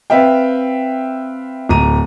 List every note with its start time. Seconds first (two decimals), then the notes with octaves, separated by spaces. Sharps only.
0.10 C4 B4 E5 F5 G5
1.69 D1 A#5 D#7